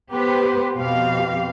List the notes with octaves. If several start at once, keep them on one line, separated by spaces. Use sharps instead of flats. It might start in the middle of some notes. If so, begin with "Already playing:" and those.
B3 G4 B4 C5
F2 B2 F3 C4 G4 F5